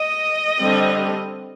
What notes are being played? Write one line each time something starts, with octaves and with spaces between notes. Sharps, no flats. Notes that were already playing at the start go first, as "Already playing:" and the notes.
Already playing: D#5
D3 G3 C4